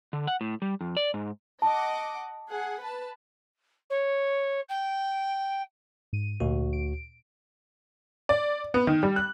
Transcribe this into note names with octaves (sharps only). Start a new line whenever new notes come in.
D3
F#5
A2
G3
F2
D5
G#2
D#5 F#5 A5 D6
G#4 F#5
B4 A5
C#5
G5
G#2 D#7
D2 A#2 F#4
D7
D5
B3
D#3
G3
F#6